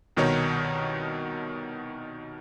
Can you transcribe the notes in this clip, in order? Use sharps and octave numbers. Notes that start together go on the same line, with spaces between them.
C2 B2 D#3 D#4 C#5